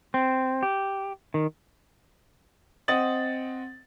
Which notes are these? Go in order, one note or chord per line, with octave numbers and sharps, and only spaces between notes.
C4
G4
D#3
C4 D#5 F#5 D#6 A6 F#7